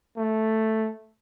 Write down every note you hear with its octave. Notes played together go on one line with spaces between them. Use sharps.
A3